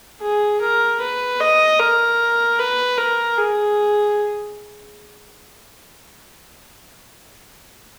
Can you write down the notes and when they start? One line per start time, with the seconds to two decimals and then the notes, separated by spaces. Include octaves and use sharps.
0.21 G#4
0.61 A#4
1.00 B4
1.40 D#5
1.80 A#4
2.59 B4
2.98 A#4
3.38 G#4